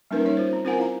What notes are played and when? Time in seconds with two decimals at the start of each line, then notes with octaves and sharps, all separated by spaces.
0.11 G3 A#3 C#4 D#4 A#4 B4
0.25 G3 D#4 C#5
0.37 F4 C5
0.53 C4
0.65 C4 F4 A#4 C5 F#5 G#5
0.78 E4 F5 A#5